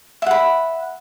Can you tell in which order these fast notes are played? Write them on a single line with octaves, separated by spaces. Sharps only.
E5 F#5 B5